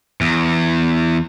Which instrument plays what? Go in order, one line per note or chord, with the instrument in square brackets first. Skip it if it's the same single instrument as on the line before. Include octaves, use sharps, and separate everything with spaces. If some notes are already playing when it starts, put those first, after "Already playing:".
[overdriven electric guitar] E2